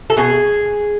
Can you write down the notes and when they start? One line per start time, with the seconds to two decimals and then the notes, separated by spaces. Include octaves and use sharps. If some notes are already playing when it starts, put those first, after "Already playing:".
0.10 A4
0.17 B2 G#4